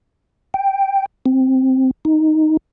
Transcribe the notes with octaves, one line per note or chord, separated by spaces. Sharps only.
G5
C4
D#4